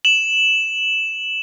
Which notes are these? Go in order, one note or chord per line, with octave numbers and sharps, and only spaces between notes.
E7 F#7